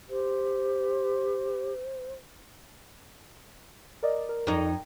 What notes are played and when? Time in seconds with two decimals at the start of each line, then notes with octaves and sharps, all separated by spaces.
0.10 G4 C5
4.03 A#4 D5 D#5
4.29 A#4
4.47 F2 D#4 G5